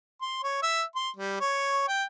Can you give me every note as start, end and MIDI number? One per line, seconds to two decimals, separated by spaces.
0.21 0.43 84
0.44 0.63 73
0.63 0.83 76
0.96 1.10 84
1.16 1.39 55
1.40 1.86 73
1.88 2.04 79